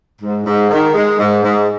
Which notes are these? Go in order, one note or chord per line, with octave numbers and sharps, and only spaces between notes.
G#2
G#2
D#3
G#3
G#2
G#2